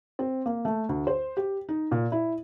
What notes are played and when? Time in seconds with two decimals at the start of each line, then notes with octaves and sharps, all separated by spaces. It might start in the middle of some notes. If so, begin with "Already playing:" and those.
0.19 C4
0.46 A#3
0.65 A3
0.89 D2
1.07 C5
1.37 G4
1.69 D#4
1.91 A#2
2.12 E4